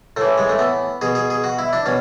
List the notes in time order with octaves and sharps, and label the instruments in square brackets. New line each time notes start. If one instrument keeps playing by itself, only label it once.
[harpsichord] A2 E3 A3
G#3
A3
B3
B2 G#4
G#4
G#4
F#4
E4
D4
B2 C#4